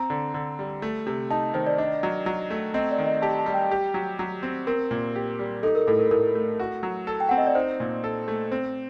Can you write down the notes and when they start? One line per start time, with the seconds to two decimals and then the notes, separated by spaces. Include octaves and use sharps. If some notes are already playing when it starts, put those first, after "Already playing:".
Already playing: C4 A#5
0.10 D3
0.34 D3
0.59 G3
0.82 A3
1.07 C3
1.30 D#4 A5
1.54 D#3 C5
1.67 D5
1.78 D4 D#5
2.03 F#3
2.26 F#3
2.50 A3
2.74 C4 D#5
2.91 D5
2.99 D#3
3.06 D#5
3.22 G4 A5
3.39 A5
3.46 G3
3.54 G5
3.71 G4
3.94 F#3
4.19 F#3
4.43 C4
4.67 C4 A#4
4.91 A#2
5.16 G4
5.39 G3
5.63 D#4 A4
5.75 A#4
5.87 A2 A4
5.99 A#4
6.11 A2 A#4
6.35 A3
6.60 F#4
6.83 F#3
7.07 A4
7.20 G5
7.29 C4 F#5
7.38 D#5
7.47 D5
7.55 D#4 C5
7.80 A#2
8.04 A4
8.28 A3
8.51 C4 C5